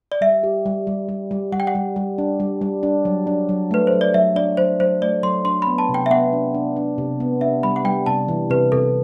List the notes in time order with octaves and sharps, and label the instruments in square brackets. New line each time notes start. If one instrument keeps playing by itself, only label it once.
[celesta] D5
[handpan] G3 [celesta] E5
[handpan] G4
G3
G3
G3
G3
[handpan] G3 [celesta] F#5
[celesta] G5
F#5
[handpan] G3
G3
D4
G3
G3
D4
F#3
D4
F#3
[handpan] A3 [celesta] B4
[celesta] C5
[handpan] F#3
[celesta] D5
[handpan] F#3 [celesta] E5
[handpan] D4 [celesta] D5
[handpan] F#3 [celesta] C5
[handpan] F#3 [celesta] C5
[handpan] A3 [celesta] D5
[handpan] F#3 [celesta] C6
[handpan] D4 [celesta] C6
[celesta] B5
[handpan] B3
[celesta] A5
[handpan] C3
[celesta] G5
E5
[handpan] B3 [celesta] F#5
[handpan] D4
D4
D4
C3
B3
[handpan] D4 [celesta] E5
[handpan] G3 [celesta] B5
[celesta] F#5
[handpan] G3 [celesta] G5
[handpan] C3 [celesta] A5
[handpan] E3
[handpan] C3 [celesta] B4
[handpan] C3 [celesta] A4